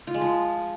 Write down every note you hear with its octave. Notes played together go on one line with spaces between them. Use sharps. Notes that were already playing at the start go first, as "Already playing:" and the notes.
F4
G#3
F3